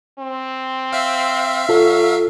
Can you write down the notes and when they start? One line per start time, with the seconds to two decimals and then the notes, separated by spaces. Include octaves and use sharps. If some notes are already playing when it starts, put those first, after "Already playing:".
0.19 C4
0.93 E5 F5
1.69 F#3 F4 A4